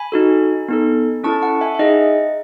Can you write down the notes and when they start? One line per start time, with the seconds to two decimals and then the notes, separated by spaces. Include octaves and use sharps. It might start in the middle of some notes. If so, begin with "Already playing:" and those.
Already playing: G#5 B5
0.12 D#4 F#4 A4
0.68 B3 D#4 A4
1.24 C#4 E4 A4 A5 C#6
1.42 F#5 A5
1.61 E5 G#5
1.75 E5
1.79 D#4 G#4 D#5 F#5